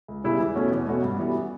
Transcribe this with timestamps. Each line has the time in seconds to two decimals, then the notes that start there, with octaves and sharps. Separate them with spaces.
0.08 C#2
0.24 C#3 G3 B3 E4
0.40 E2
0.55 B2 A3 C#4 F#4
0.72 E2
0.87 B2 A3 C#4 F#4
1.03 G2
1.18 E3 G3 B3 F#4